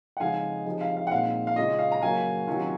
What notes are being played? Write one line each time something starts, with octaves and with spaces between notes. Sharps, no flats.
F#5
F2 C#3 G#3 D#4 F5 G#5
C3 F3 G#3 D#4
F5
F5
F#5
A#2 G#3 C4 D#4 F5
F5
C#3 G#3 C#4 F4 D#5
F5
A#5
C#3 F#3 A#3 C#4 F5 G#5
C3 D#3 F#3 C#4 F4